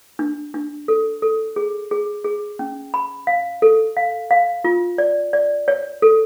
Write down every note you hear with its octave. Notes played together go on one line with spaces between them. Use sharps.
D4
D4
A4
A4
G#4
G#4
G#4
C#4
B5
F5
A4
F5
F5
F4
D5
D5
C#5
A4